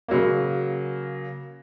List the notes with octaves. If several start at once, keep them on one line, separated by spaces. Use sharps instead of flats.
C#3 F#3 A#3